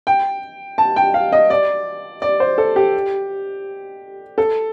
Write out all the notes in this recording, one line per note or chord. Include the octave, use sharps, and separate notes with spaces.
G5
A5
G5
F5
D#5
D5
D5
C5
A4
G4
A4